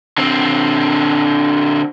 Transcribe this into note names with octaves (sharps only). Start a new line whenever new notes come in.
D3 C4